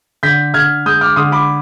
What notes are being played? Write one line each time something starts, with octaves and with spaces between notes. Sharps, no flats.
D3 G6 B6
D3 F6 G#6
G#3 D#6 G6
D6 F6
D3 C6 D#6
B5 D6